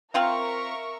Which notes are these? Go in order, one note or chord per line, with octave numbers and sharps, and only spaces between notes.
C4 F4 A#4 E5 F5 C#6